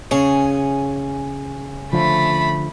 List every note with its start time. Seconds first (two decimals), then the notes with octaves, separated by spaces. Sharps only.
0.11 C#3 C#4 G#4
1.93 D3 F3 A3 B5